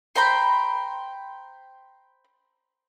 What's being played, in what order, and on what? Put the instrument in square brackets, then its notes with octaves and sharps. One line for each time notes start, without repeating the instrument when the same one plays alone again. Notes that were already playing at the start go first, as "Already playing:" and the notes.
[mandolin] C5 G5 A#5 B5